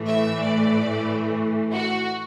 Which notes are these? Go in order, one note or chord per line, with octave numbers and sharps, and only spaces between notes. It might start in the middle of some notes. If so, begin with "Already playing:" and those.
Already playing: A2 E3 A3
E5
D5
F#4